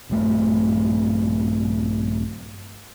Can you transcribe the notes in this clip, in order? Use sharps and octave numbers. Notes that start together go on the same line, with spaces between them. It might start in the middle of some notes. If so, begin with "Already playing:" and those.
A#1 G2 A3